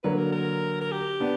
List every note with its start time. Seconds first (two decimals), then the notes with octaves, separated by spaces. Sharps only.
0.03 D3 F#3 A#3 B4
0.18 A#4
0.32 A#4
0.81 A#4
0.92 G4
1.20 B3 D4